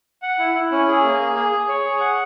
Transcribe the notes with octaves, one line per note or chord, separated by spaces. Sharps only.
F#5
E4
E4
C#4
G#4
A#3
G#4
G#4
G#4
C#5
G#4
F#5